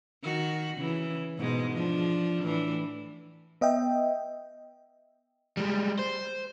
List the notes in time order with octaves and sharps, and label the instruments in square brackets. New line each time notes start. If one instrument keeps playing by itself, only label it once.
[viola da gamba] D#3 F#4
C#3 E3
G#2 B2 G#3
F3 D4
A2 E3 D4
[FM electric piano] B3 D#5 E5 G5
[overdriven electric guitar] G3 G#3
C5